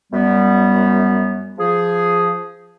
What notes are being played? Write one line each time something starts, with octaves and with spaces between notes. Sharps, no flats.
F#2 G3 B3
F3 G#4